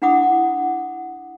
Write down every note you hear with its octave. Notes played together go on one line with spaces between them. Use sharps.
D4 E4 F#5 B5 D6 D#6